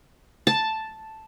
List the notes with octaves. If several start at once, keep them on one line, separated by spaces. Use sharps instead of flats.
A5